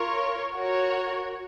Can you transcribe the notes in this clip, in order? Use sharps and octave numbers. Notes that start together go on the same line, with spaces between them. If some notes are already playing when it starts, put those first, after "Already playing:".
Already playing: F4 A#4 C#5
F#4 A#4 C#5